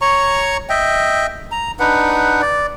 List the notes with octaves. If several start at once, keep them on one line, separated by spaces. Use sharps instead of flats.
C#5 A#5 C#6
D#5 E5 G5
A#5
D4 D#4 B4 F#5
D5